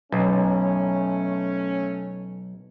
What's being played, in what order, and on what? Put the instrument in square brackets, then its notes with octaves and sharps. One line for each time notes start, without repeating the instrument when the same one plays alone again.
[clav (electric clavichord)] B1 [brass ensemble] A3 C#4